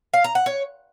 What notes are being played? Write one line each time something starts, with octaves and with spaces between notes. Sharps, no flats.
F5
A#5
F#5
C#5